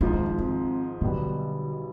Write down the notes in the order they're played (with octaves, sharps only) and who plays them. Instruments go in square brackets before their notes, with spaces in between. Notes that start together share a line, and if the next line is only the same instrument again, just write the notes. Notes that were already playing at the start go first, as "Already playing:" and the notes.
[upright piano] G#1 G#2 F3 [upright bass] D4
[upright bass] D#4
D4
C4
[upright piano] B1 B2 G3 B3 [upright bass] D3